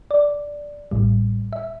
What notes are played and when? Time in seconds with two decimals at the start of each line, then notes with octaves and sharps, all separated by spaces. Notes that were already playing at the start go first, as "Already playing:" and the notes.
0.11 D5
0.91 A1 A2 G3
1.53 E5